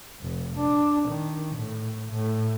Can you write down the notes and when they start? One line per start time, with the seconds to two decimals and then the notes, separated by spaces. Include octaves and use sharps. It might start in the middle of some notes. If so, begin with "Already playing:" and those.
0.22 F1
0.57 D4
1.09 D#3
1.56 A2
2.12 A2